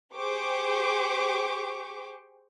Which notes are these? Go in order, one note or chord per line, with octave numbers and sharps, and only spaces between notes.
G4 G#4 C5 G5 C#6 D6